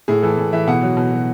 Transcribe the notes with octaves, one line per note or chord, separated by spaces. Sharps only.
A2 G#4
E3 A4
A2
E3 E5
B2 F#5
F#3
B2
F#3